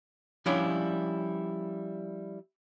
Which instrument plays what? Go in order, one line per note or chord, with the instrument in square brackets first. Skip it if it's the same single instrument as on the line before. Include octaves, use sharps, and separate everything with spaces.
[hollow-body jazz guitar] F3 G3 C#4 D4 E4